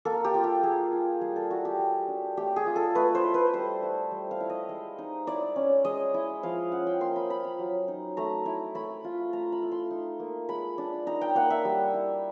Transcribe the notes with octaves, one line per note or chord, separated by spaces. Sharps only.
A#3 A4
G4
F4
G4
A#3 G#4
F4
G3 G#4
A4
E4 F#4
G4
G3
D4
A3 G4
G#4
F4
A4
A3 B4
C5
E4
B4
G3 C5
E4
G3
F5
E4
D#5
G#3 D#5
D#4
E4 D5
C#4
G#3 D#5
E4
F3 F5
C#4 F#5
G5
A#3 C6
B5
F4 B5
A#5
F#3
D#4
A3 A#5
E4
A3 B5
F4
A3 A#5
B5
E4
C6
D#4
A#3
G#3 B5
D4
D#4 A#5
G5
A#3 F#5
E5
G3
E4